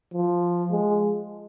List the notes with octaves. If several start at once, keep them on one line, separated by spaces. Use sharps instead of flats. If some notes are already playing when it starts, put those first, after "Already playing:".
F3
G#3